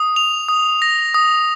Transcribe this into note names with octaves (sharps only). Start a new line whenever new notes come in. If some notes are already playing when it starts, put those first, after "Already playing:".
Already playing: D#6
F7
D#6
A#6
D#6